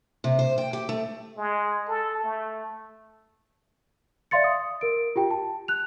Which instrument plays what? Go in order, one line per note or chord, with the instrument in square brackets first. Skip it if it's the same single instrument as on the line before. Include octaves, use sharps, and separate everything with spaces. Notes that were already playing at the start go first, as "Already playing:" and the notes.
[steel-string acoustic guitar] C3
C5
G5
G4
A3
[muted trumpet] G#3
A4
A3
[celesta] D5 E5 F5 C6 A6 C#7
D#6
A#4 D7
F4 G4 G5
A5
F#6 F7